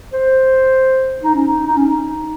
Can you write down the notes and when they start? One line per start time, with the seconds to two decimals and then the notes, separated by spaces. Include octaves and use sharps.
0.13 C5
1.23 D#4
1.34 C#4
1.46 D#4
1.67 D#4
1.76 C#4
1.86 D#4